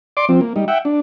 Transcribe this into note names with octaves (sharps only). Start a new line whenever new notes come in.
D5 C6 D6
F3 C4
A#3
G3 D#4
E5 F#5 G5
D4